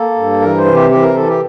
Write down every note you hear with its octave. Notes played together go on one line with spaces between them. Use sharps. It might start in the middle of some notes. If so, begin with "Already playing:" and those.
Already playing: A#3 A4
G2
E3 A#4
C5
C3
G4
E3 G4
A#4
E3 A4
G4